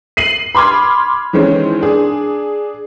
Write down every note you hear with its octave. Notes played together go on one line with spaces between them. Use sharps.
C7 D#7 F#7
B5 C6 D6 F6 G#6
D#3 E3 G#3 C4 C#4
D4 G#4